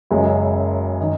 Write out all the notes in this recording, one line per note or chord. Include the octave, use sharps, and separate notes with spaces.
F#1 F#2 C#3 G#3
D#3